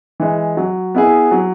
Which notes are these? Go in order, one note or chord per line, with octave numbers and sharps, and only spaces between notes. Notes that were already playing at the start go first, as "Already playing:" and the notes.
E3 G#3
F#3
B3 E4 G#4
F#3